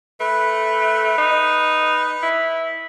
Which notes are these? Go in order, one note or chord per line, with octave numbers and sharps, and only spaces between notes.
A3 B4
D#4
E4